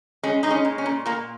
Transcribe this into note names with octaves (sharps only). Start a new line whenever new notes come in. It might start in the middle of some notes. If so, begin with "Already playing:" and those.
G#3 C#4
G#3 D#4
C#4
A#2
C#4
A#2
A#2 A#3